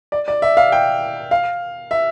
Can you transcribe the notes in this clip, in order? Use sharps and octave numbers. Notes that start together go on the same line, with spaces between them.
D5
D5
E5
F5
G5
F5
E5